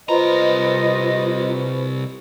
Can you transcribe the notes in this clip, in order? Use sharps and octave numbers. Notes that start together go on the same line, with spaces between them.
C2 F4 B4 C5 D#5 A#5 B5